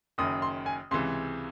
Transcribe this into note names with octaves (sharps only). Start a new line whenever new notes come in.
F#1 F#2 D#3 D#6
C6
G#5
C#2 C3 E3 C6